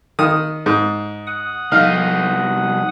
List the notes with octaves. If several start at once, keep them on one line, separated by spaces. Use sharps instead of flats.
D#3 D#6
G#2
F#5 D#6
C2 D#4 F5